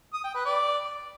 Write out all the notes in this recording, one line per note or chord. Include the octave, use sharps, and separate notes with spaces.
D#6
G5
B4
D5